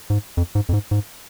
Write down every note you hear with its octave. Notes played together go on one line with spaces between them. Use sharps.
G#2
F2
G#2
F2
G#2
G#2